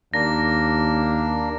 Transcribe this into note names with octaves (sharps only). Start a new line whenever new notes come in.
D#2 A#3 D4 A#6